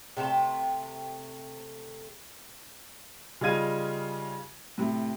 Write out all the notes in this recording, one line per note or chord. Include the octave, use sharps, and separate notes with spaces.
C3 A3 G5 A5
C#3 G3 D#4 F4 G#6 D#7
A2 C3